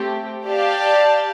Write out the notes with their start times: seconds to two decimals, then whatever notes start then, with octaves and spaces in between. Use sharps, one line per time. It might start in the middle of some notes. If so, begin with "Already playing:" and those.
Already playing: A3 C4 G4
0.47 G4 D5 F5 A5